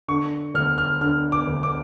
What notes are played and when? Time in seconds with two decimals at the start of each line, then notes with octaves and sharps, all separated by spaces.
0.08 D3 C#6
0.55 D2 F6
0.78 F6
1.01 D3 F6
1.32 D6
1.47 D2
1.63 D6